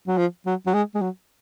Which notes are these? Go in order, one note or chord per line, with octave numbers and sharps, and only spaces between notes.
F#3
F3
F#3
F#3
G#3
G#3
F#3